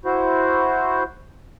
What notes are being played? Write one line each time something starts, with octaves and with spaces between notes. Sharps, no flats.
E4 F#4 C5